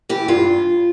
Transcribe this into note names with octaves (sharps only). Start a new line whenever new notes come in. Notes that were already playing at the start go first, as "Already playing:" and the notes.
E3 G4
G2 F4